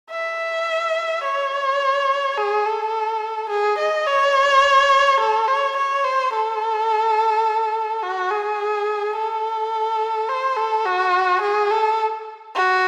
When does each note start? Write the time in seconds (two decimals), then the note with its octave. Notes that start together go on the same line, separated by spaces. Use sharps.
0.11 E5
1.24 C#5
2.37 G#4
2.65 A4
3.49 G#4
3.78 D#5
4.06 C#5
5.20 A4
5.48 C#5
5.77 C#5
6.04 C5
6.33 A4
8.03 F#4
8.31 G#4
9.16 A4
10.29 C5
10.57 A4
10.85 F#4
11.42 G#4
11.71 A4
12.55 F#4